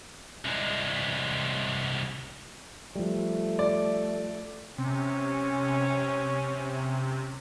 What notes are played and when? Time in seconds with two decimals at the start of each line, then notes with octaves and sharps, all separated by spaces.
0.45 C2 G#3
2.96 F3 G3 A3
3.59 D5
4.78 C3 C#4